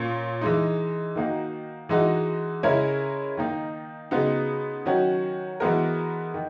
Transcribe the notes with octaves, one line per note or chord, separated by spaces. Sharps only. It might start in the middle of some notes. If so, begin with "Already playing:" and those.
Already playing: A#2 A#3 C#4
E3 G#3 D#4
D#3 A#3 D#4 F#4
E3 G#3 D#4 F#4
C#3 G#3 C#4 E4 A#4
D#3 A#3 D#4
C#3 G#3 B3 D#4 F#4
D#3 F#3 C#4 F#4
E3 G#3 B3 F#4 A#4
D#3